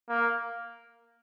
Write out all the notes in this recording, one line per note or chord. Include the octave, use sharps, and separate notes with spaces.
A#3